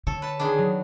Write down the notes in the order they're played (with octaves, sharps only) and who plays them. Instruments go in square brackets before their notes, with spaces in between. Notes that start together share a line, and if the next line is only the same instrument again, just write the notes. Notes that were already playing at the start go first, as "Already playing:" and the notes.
[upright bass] D3 [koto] A4 [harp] C#5
[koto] B4 A5
[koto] D#3 B3 D4 [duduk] G#4
[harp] F#3